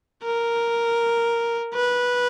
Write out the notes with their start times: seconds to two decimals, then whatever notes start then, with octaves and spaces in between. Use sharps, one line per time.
0.24 A#4
1.75 B4